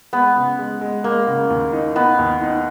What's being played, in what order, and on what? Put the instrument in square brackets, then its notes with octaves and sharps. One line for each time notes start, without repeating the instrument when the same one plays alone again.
[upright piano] G#3 [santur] B3
[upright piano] C#3
G#3
G#3
[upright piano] G#3 [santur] A#3
[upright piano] C#3
D#2
D#4
[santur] B3 [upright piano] D#4
[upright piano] D#2
D#4